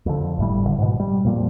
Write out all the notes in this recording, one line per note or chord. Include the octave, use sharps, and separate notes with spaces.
F2 D3
G1 A2 G3
D2 D3
G#2 B2
G3
F2 A#2 F3 G3